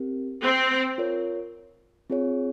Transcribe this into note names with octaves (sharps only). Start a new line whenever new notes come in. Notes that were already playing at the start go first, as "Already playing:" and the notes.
Already playing: C4 G4 A#4
C4
F4 A#4 C#5
C4 F4 G#4 C#5